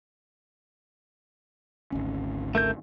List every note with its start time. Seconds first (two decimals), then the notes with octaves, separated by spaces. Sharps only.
1.92 G#1 D2 C#4
2.55 A3 A#4 G6